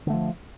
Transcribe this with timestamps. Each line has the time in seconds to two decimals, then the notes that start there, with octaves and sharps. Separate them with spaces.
0.07 D3
0.10 A3
0.13 F3